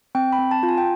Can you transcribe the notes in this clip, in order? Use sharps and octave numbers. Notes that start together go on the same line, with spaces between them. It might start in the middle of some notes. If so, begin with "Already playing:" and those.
C4 G5
B5
C4
A5
F4
G#5
G5